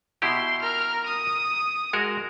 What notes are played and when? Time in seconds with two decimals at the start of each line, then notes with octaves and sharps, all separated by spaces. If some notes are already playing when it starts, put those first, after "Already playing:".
0.22 B2 E4 G4 C6
0.62 A#4 F6
1.06 D#6
1.93 G#3 F#4 A#4